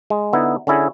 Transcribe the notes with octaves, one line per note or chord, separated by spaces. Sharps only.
G#3
D3 B3 D#4 E4
D3 C#4 E4 G#4